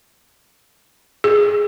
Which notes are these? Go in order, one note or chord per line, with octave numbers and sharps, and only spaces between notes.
G#4